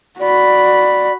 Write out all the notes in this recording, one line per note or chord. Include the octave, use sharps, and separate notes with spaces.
F#4 D5 B5